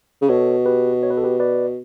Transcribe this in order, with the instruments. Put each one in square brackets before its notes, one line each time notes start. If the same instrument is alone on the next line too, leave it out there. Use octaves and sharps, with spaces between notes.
[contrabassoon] C#3
[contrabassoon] B2 [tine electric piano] A4 C#5
[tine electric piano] G4 B4
C#5
B4
A4
G4 B4
B4 D5